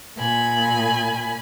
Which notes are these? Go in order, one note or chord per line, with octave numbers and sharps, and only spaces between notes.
A#2 G#5 B5